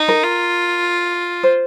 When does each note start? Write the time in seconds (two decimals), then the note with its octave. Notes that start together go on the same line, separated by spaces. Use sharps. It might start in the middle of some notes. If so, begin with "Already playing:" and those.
Already playing: D#4
0.08 A#4
0.24 F4
1.43 C5